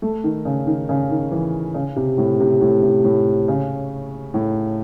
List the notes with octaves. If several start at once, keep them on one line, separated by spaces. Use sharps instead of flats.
A3
D#3
C#3
D#3
C#3
D#3
E3
C#3
C3
A2
C3
A2
C3
A2
C#3
A2